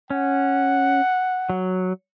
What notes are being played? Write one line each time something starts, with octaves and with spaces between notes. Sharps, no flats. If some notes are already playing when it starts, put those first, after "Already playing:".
C#4 F#5
F#3